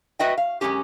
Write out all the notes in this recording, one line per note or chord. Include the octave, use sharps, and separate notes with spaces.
F#4 B4 D#5 E5 G5
F5
F#2 D3 G#3 C#4 G4